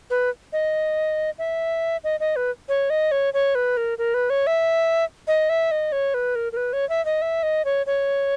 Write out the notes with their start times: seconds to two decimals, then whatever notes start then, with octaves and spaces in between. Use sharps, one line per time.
0.10 B4
0.53 D#5
1.39 E5
2.04 D#5
2.20 D#5
2.36 B4
2.69 C#5
2.90 D#5
3.12 C#5
3.34 C#5
3.55 B4
3.77 A#4
3.98 A#4
4.14 B4
4.30 C#5
4.47 E5
5.28 D#5
5.49 E5
5.71 D#5
5.92 C#5
6.14 B4
6.35 A#4
6.52 A#4
6.57 B4
6.73 C#5
6.89 E5
7.05 D#5
7.22 E5
7.43 D#5
7.65 C#5
7.86 C#5